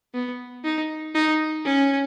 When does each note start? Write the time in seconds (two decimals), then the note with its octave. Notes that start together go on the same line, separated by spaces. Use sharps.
0.14 B3
0.65 D#4
1.15 D#4
1.65 C#4